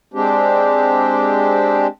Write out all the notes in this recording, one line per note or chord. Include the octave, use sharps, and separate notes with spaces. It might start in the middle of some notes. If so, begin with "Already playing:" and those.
G#3 C4 D4 G4